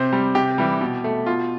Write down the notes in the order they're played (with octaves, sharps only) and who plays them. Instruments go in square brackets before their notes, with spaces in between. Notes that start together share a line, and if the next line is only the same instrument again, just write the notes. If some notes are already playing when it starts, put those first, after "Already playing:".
Already playing: [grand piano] C3 C5
G3
C3 G4
E3 G3
B2
A3
B2 F4